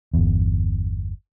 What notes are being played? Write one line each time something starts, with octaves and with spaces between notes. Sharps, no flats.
G1 E2